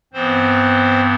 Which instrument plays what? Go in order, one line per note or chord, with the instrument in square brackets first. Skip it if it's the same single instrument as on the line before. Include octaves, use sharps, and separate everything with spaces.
[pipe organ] G2 E3 B3 C4 C5